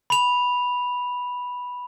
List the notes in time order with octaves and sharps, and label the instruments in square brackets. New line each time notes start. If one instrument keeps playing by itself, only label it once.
[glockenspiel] B5 F7